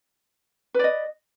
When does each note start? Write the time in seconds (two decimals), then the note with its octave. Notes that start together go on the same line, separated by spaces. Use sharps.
0.74 B4
0.79 D5
0.84 D#5